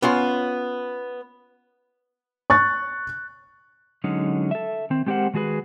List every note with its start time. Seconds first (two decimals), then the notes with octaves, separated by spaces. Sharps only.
0.02 B3 C#4 F4 C6
2.50 C#6 F#6 A6
4.04 D3 F#3 G#3 C#4 D#4
4.51 A4 E5
4.90 D#3 C4
5.06 G#3 C4 G4 A#4 C5 F#5
5.34 D#3 G#3 F#4 G#4 B4